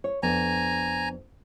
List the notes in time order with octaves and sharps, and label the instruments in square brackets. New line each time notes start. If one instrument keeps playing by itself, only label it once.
[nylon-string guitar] C#5
[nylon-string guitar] F2 B3 D4 [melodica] G#5 A#5